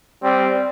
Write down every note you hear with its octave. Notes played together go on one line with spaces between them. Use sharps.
G3 C4